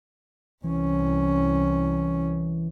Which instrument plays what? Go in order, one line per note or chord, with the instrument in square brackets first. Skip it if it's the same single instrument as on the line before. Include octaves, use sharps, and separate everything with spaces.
[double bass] C2 C#4 [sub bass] E3